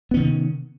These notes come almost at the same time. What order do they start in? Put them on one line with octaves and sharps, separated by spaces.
B3 C#4 D#3 C3